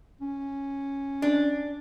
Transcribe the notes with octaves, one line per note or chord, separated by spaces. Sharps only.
C#4
D4